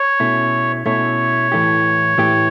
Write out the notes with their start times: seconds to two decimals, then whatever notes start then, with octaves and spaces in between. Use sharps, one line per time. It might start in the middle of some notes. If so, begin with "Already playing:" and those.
Already playing: C#5
0.20 B2 A3 C#4 E4
0.86 B2 A3 C#4 E4 C#5
1.52 A2 E3 A3 E4 G4
2.18 A2 E3 A3 E4 G4